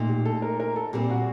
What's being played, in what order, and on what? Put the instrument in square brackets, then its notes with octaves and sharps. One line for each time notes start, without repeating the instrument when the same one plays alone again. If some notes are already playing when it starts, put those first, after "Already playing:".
Already playing: [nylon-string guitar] A#2 A3 D#4
[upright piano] G4
A4
A#4
A#4
A4
[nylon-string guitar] A#2 G3 C4 [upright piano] G4
[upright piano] F#4